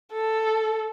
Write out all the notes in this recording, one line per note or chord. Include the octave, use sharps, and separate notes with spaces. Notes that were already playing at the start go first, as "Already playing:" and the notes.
A4